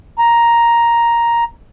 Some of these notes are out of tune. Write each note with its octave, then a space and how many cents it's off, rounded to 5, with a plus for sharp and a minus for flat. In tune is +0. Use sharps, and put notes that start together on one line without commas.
A#5 +5